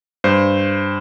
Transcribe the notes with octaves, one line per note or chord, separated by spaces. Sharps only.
G2 C5